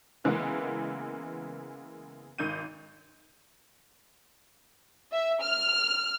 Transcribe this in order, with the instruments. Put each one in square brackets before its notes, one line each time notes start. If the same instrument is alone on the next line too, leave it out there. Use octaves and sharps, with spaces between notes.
[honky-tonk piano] C#3 E3 G#3 A#3 B3
G#1 D#3 G6 D#7
[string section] E5
F6